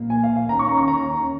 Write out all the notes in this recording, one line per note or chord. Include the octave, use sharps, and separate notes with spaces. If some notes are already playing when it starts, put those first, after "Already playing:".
Already playing: A#1 A#2 A#3
G#5
F5
F5
D#2 D#3 C#4 A#5
C#6
A#5
C#6
A#5